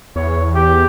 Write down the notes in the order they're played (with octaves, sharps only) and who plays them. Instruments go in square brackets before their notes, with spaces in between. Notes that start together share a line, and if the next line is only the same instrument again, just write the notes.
[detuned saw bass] E2 [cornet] C#5
[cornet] G4